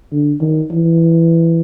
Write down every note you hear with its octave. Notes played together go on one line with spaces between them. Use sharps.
D3
D#3
E3